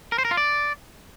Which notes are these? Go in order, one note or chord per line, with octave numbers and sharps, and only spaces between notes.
A#4
C5
A#4
F4
D5